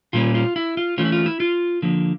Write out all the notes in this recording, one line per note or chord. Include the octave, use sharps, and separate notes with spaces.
A#2 G3 A#3 C#4 F4
F4
E4
F4
E3 A3 C#4 F4
E4
F4
E4
F4
D3 F3 A#3